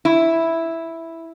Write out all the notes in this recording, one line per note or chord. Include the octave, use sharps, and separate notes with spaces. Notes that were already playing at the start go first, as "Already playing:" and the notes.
E4